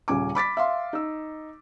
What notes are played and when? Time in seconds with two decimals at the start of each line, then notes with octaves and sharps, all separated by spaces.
0.08 D#1 C#3 G#5 D6
0.35 B5 D6 A6 B6
0.57 E5 F5 C6
0.93 D#4 E6